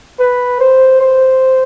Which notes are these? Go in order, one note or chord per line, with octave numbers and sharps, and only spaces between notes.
B4
C5
C5